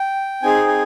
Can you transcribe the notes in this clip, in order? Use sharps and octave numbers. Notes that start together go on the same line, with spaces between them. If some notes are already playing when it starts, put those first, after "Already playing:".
Already playing: G5
C4 D#4 G#4 G#5
G#5